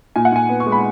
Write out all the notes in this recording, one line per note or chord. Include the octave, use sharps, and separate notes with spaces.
A#2 G#5
F#5
A#2 G#5
B3
C#6
G#3
B5